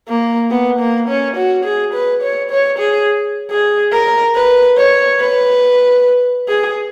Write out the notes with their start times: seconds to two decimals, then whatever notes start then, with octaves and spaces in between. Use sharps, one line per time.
0.08 A#3
0.50 B3
0.80 A#3
1.08 C#4
1.36 F#4
1.64 G#4
1.93 B4
2.22 C#5
2.51 C#5
2.79 G#4
3.50 G#4
3.92 A#4
4.35 B4
4.77 C#5
5.20 B4
6.48 G#4